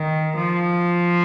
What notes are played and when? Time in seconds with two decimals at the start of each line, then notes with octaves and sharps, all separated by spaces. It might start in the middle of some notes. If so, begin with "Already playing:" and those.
Already playing: D#3
0.37 F3